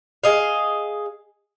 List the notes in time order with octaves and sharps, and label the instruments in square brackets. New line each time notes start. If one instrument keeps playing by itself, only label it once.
[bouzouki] G#4 D#5 F5